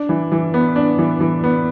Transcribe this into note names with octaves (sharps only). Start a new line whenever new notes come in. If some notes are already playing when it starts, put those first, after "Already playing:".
Already playing: D4
E3
E3
B3
D4
E3
E3
B3